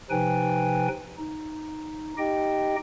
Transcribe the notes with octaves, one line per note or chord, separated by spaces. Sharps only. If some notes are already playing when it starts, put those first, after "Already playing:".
C3 F3 D#4 B4 G5 G#5
D#4
D#4 G4 D#5 G5